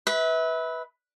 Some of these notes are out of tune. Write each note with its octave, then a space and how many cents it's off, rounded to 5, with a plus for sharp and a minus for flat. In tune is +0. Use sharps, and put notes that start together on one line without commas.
B4 +0 E5 -30